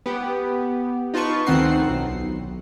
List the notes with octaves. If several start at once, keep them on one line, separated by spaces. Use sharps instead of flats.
B3 G4
D#4 F4 B4 A5 C#6
D2 D#3 C4 D#4 F#5 C7
B1